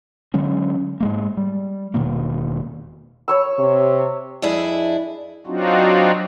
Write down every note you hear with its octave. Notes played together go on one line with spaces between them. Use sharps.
D3 F#3 G#3 C#4
G#2 G#3 A#3
G3
E1 B2 D#3 A#3
C#5 C#6 E6
C3
F2 D4 E4 G#4
F#3 C4 D4 D#4 F4 F#4